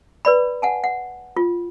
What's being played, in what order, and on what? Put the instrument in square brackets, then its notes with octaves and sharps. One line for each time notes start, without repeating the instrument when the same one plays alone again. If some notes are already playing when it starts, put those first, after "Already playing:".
[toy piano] B4 D5 B5
F#5 G#5 A5
F#5
F4